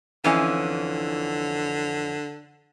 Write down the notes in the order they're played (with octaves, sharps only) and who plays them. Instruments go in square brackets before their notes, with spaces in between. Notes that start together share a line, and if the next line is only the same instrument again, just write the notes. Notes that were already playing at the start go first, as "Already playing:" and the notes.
[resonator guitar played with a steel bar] F2 E3 C#4 [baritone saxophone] D3